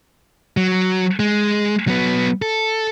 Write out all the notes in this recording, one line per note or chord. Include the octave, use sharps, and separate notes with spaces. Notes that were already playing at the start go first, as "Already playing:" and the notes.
F#3
G#3
F#3 B3
A4